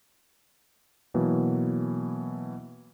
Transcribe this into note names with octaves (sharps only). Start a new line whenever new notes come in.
B2 E3 F#3 A#3